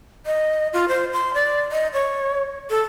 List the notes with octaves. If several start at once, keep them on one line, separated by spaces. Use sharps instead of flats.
D#5
F4
C5
C6
D5
D#5
C#5
A4